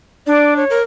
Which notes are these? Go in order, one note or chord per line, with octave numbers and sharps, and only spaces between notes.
D4 D5
C#5
A#4